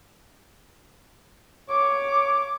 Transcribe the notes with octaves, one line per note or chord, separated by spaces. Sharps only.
C#5 D6